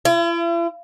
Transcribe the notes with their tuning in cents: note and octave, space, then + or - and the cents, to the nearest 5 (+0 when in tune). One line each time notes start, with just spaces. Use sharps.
E4 +45